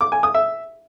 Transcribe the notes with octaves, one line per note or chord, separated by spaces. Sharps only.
D6
G#5
D#6
E5